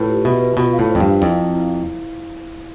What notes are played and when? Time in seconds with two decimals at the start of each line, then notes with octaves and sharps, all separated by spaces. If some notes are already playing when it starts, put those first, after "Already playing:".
Already playing: A2 F4 B4
0.08 G4
0.25 B2 E5
0.41 B4
0.57 B2 F4
0.73 F5
0.79 A2
0.89 C5
0.95 F2
1.00 G2
1.06 F5
1.22 F2 E4
1.38 E4
1.54 E4
1.70 E4